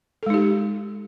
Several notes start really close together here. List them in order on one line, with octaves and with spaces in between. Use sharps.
A4 G#3 D#4 G4